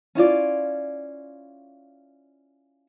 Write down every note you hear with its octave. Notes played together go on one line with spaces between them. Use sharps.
C#4 E4 F4 D5